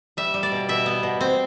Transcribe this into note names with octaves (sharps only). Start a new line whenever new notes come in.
G3 E5
G3
D5
B2
B2 E5
B3
B2
C4